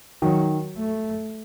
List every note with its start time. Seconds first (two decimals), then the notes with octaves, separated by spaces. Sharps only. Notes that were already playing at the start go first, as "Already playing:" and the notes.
0.22 D#3 F#3
0.78 A3